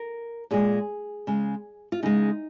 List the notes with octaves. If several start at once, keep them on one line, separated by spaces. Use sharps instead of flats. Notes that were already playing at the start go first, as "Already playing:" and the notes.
Already playing: A#4
A#2 G#3 G#4
C#3 G#3
F4
C#3 G#3 D#4